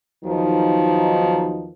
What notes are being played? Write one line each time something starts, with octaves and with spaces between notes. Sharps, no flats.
E2 D#3 F3 F#3 D#4